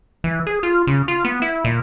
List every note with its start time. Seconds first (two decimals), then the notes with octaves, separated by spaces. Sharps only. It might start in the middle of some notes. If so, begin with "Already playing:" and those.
0.24 E3
0.47 G#4
0.63 F4
0.87 C#3
1.08 F4
1.25 B3
1.42 E4
1.65 A#2